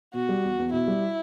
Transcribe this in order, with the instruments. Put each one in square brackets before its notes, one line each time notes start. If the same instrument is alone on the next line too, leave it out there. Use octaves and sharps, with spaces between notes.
[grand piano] B2 [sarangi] F#4
[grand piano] G3
E2
E2
[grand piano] B2 [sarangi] E4
[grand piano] G3